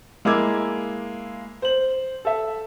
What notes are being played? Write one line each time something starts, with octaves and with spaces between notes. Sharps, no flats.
G#3 A#3 E4 D6 E6 G#6
C5 F#7
A4 E5